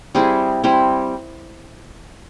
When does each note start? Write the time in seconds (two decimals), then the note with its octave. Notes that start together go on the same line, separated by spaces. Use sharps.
0.15 G3 C4 E4 G#4
0.64 G3 C4 E4